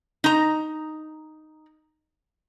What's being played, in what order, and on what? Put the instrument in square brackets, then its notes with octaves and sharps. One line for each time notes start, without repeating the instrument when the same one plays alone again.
[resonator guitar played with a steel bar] D#4 A#5